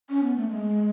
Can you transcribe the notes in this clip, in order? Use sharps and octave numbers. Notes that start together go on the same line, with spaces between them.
C#4
B3
A3
G#3